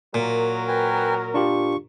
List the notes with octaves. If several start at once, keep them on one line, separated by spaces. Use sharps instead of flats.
A#2 F#3 A#4
B4 G5 G#5
D4 F4 G4 C#6